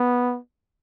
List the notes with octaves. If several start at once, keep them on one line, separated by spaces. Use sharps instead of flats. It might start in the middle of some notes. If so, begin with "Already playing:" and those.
Already playing: B3